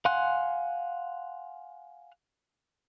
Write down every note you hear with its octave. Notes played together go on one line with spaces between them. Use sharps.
F5 F#5 G#5 C6 F#6